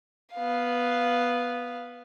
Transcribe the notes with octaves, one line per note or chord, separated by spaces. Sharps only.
B3 F5